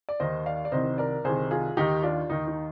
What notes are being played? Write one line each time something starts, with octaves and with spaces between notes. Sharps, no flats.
D5
D#2 D#3 C5 D#5
D5 F5
D5
C2 C3 D#3 C5 D#5
A#4 D5
C2 C3 D#3 G#4 C5
F4 G#4
D#2 D#3 D#4 G4
D4 F4
D#2 D#3 D#4
D#4